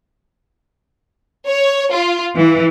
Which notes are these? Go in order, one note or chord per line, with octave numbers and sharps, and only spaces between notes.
C#5
F4
E3